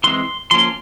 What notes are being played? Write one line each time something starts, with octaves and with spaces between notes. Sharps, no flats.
E3 G#3 C4 C6
F3 A#3 C#4 C6